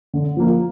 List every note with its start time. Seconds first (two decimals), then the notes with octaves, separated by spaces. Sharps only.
0.14 D3
0.37 F3 A#3